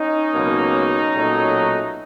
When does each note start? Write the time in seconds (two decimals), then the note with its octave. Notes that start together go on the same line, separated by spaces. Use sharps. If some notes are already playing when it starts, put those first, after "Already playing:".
Already playing: C#4 D#4
0.34 C#2 B2 F#3 A#3
1.14 B1 A#2 F#3 A3